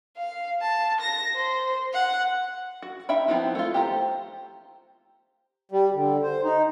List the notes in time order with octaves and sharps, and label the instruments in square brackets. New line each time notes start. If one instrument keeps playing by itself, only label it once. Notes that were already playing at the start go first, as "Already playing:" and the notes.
[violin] F5
A5
A#6
C5
F#5
[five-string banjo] F#4
D#4 E5 G5 B5
F3 B3 C4 D#4 E4
A3 F4
G4 C5 A#5
[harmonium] G3
D3
C5
D#4